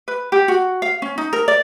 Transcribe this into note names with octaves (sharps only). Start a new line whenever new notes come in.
B4
G4
F#4
F5
C#4
D#4
A#4
D5